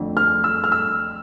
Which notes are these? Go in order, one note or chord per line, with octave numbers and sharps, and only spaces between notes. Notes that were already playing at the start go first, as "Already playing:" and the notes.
Already playing: F2 D3 A3
F6
E6
F6
E6